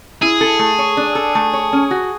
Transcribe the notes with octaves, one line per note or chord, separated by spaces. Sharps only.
E4 G#4
A4
A3
C#5
D4
A4
A3
C#5
C#4
F#4